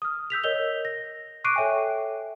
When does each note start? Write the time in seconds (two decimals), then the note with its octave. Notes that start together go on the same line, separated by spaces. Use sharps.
0.02 D#6 F6
0.30 E6 G6 B6 F7
0.44 A#4 C#5 D#5 G6 F7 G7
0.85 A#6
1.44 C#6 D6 F#6 C7 D7 D#7
1.56 A4 C#5 E5 G5 G#5